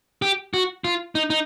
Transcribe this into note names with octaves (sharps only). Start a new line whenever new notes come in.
G4
F#4
F4
D#4
D#4